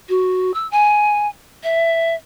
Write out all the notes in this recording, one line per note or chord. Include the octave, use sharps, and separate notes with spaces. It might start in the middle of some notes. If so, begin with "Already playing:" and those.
F#4
E6
G#5
E5